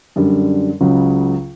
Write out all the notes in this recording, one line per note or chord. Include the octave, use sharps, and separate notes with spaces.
F#2 D3 G3
C#2 C#3 F#3